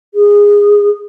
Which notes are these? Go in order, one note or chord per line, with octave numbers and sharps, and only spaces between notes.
G#4